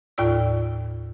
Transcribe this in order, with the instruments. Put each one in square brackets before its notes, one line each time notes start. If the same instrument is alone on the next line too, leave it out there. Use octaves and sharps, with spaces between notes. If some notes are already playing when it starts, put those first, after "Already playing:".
[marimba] D#2 A2 F4 D5 E6